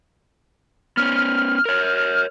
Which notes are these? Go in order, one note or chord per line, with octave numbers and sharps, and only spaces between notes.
B3 C#4 F6
A#4 C#5